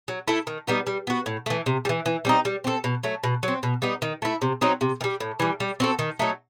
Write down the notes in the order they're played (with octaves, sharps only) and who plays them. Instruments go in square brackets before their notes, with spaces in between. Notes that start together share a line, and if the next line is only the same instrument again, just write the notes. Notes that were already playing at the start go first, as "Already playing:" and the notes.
[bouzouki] F#3
A3 E4 A4
D#3
G3 B3 D#4
G3
B3 F#4
A2
E3 A3
C3
G3
E3
E3
G3 C4 D#4
G3
C4 F#4 A4
B2
F#3 A3
B2
F#3 C4
B2
G3 B3 D#4
D#3
A3 E4
C3
F#3 C4 D#4
C3
D#3
G3
A2
E3 G3
G3
C4 F#4 A4
D#3
F#3 A3 D#4